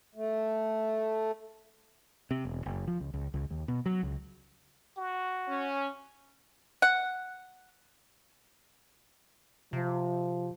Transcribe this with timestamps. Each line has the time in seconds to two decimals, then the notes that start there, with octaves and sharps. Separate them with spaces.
0.15 A3
2.31 C3
2.45 E1
2.66 F#1
2.87 F3
3.00 C#2
3.14 C#2
3.34 C#2
3.51 D#2
3.68 B2
3.86 F#3
4.03 C#2
4.97 F#4
5.49 C#4
6.82 F#5
9.73 C3 F3